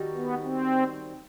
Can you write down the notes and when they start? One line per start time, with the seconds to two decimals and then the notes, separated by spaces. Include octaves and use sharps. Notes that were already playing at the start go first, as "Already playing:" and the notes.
Already playing: D#3 G3 D#4 F#4
0.14 B3
0.43 C4